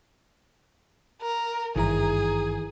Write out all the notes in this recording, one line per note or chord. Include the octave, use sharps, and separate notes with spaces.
A#4
G#1 G2 D#3 E3 G#4 A#5